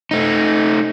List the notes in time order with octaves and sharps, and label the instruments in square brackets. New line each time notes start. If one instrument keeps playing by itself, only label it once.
[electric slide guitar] A3 D#4